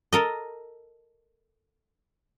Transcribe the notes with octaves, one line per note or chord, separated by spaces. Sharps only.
A4 A#4 D#5